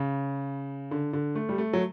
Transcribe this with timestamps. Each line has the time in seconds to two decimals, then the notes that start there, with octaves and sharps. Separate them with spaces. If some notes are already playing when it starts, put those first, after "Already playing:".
Already playing: C#3
0.91 D3
1.13 D3
1.35 A3
1.49 G3
1.58 A3
1.73 F#3